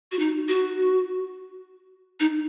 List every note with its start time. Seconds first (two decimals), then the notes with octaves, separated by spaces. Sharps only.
0.12 F#4
0.19 D#4
0.48 F#4
2.20 D#4